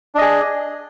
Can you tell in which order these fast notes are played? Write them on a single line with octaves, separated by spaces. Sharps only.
D4 D#5 G#4